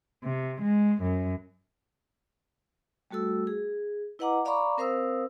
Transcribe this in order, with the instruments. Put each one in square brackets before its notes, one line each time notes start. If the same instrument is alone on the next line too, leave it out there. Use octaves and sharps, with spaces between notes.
[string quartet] C3
G#3
F#2
[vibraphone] G3 A3 F#4 A4 E6
G#4
E4 B4 D#5 F#5 A#5 D6
D5 F5 A#5 B5 C#6 D6
C4 A#4 C5 F5 D#6 E6